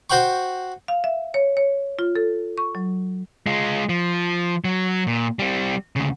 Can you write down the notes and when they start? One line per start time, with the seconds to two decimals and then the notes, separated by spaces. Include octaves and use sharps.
0.10 F#4 C5 F#5 G5 C#6
0.88 F5
1.04 E5
1.34 C#5
1.57 C#5
1.99 F4
2.16 A4
2.58 C#6
2.75 F#3
3.46 G#3 F4
3.89 F3
4.64 F#3
5.07 A#2
5.39 G3 C4
5.96 D2 C#3